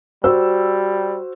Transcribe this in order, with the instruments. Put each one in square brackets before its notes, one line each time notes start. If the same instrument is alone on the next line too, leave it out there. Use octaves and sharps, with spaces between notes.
[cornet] G3 [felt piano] F#4 C5 E6